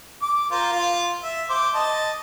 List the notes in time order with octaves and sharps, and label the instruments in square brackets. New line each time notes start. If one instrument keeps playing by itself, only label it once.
[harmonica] D6
F4 A#4 C5
F4
E5
C5 D6
D#5 A5